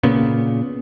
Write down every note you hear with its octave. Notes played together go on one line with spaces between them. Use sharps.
A#2 C#3 B3